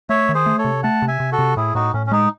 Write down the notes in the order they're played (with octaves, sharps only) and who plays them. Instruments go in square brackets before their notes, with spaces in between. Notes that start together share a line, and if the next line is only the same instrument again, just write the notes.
[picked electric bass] A3 [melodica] C#5 E5
[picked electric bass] D#3
[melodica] G#4 C5
[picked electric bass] A3
[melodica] A4 C#5
[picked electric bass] C3
[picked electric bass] A3 [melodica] F#5 A5
[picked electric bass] C3
[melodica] E5 G#5
[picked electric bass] C3
[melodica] F#4 A4
[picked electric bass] C3
[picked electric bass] A2 [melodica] E4 G#4
[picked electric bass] A2 [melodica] D#4 F#4
[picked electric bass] A2 [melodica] C#4
[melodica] C#4
[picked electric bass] G#3 [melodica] D#4